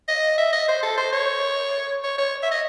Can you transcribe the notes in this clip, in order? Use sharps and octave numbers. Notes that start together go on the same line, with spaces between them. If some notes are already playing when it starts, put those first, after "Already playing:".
D#5
E5
D#5
C5
A4
C5
C#5
C#5
C#5
E5
D#5